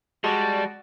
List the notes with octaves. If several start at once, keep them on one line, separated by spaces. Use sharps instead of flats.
G3 G#3 F#4 D5 A5